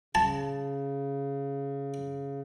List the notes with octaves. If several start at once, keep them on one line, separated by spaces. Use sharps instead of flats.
C#3 A5